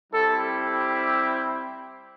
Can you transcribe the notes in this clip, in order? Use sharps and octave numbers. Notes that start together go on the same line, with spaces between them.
G3 C4 E4 G4 A4